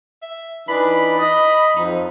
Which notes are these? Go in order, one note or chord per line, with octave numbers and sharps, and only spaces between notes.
E5
E3 D4 D#4 B5
D#5
F2 D#4